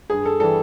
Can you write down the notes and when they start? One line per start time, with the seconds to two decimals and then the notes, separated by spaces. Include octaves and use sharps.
0.10 G2 G#4
0.25 A4
0.40 E3 G3 A4